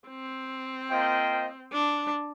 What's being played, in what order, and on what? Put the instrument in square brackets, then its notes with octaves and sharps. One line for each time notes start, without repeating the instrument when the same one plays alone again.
[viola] C4
[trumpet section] A#3 F4 C5 D#5 G5
[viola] D4